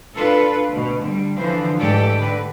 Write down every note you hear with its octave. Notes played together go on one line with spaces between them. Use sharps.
D4 F4 A4 B4
D2 B2
D3 G3
D3 E3 F3 C5
G#2 E3 A3 G4 A4 D5
D3 B4